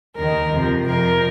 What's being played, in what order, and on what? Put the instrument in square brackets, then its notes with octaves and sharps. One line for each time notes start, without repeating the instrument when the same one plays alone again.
[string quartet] D#2 D#3 A#4
F2 C3 F3
F2 C3 F3 A#4